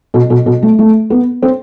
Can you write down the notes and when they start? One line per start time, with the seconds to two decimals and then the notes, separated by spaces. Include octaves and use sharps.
0.14 B2
0.30 B2
0.46 B2
0.63 A3
0.79 A3
1.10 B3
1.42 C4